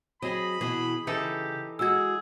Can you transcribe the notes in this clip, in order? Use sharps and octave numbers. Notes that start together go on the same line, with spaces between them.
F#3 C4 G#4 D#5 B5
B2 E3 G#4
C#3 E3 D#4 G4 A4
G#3 E4 F#4 G#4 E6 G#6